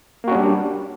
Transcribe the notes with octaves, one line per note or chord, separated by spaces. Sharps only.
G3 A#3 C#4 D4 F#4